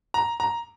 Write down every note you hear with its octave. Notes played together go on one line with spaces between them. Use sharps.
A#5
A#5